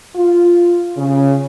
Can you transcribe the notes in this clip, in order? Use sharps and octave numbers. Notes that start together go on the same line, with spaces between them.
F4
C#3